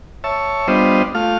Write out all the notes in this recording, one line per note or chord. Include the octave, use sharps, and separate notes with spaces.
C#5 E5 A5
G3 B3 D4 F4 C5 D#5
A3 F4 F5